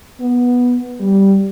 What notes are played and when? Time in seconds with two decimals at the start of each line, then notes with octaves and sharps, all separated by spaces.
0.20 B3
1.00 G3